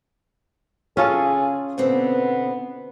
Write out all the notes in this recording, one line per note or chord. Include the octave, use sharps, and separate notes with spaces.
C#3 C#4 F4 G#4 A4
B2 D3 B3 C4